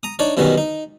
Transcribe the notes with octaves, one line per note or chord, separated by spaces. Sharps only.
A#5 D#6
D4 D#4 C#5 D5
F#2 B2 D#3 G3 B3 C#4
D#4